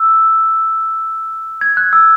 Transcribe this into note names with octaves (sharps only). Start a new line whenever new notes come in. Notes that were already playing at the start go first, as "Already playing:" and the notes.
Already playing: E6
G#6
F#6
E6